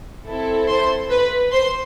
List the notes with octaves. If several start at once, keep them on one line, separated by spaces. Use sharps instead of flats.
C4 E4 A4
C5 C6
B4 B5
C5 C6